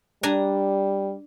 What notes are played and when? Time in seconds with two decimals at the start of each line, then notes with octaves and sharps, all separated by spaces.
0.23 G3 D4 G#5 A#5